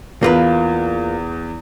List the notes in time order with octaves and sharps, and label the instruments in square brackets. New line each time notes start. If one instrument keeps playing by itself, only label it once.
[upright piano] E2 [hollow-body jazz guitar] A#3 F4 B4